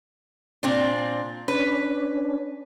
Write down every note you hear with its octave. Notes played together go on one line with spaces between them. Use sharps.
A#2 C4 D4
C#4 D4 B4